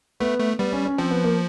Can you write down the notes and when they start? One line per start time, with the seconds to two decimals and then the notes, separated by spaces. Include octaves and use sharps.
0.20 A3 B3
0.39 A3
0.59 G3 B3
0.73 C#4
0.85 C#4
0.98 F3 C4
1.11 B3
1.24 A#3